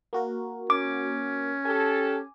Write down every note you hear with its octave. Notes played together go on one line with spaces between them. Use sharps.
A#3 F#4 A#4
C#4 D6
G4 A4 G#5